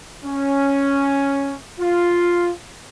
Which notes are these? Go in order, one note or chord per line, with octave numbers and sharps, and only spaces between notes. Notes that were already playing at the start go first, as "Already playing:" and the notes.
C#4
F4